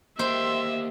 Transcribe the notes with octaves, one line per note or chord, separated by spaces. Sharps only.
A#3 G4 C5 E5 C6